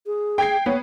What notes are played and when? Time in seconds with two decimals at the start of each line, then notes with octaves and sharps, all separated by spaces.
0.06 G#4
0.38 G5 G#6 C7
0.66 B3 C#5